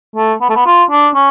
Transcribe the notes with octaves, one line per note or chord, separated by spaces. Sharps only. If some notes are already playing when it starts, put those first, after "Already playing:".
A3
B3
A3
B3
F4
D4
C#4